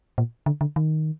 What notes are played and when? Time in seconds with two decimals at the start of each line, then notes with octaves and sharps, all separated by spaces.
0.18 A#2
0.46 D3
0.61 D3
0.76 D#3